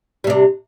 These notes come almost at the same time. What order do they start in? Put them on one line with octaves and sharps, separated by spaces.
G3 C3 D4